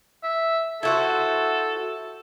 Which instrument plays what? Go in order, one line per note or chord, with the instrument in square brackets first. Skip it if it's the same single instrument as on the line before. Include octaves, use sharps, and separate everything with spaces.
[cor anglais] E5
[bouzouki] E4 F#4 C5 [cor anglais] A4